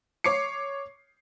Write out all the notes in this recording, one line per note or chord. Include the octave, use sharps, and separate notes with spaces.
C#5 D6 C7 C#7